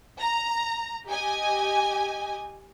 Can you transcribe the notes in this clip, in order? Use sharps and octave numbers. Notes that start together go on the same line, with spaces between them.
A#5
G4 D#5 G#5